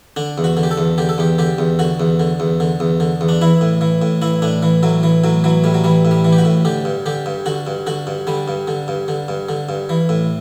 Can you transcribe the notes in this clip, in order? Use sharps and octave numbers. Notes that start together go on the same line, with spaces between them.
D3 D4
E2
F#4
D3
G4
A4
E2
D3 G4
A4
E2 G4
D3 G4
E2
D3 F#4
E2
D3
E2
D3
E2
D3
E2
D4
E3 E4
A2
E3
A2
E3 E4
A2 D4
E3
A2 F#3
E3
A2 F#3
E3 F#3
A2 G3
F#3
E3 G3
A2
G3
E3
G4
F#4
A2
D3 G4
G2
D3 G4
G2
D3 F#4
G2
D3 F#4
G2
D3 G3
G2
D3
G2
D3
G2
D3
G2
E3
A2